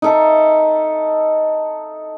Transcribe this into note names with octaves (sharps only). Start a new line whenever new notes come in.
D#4 A4 E5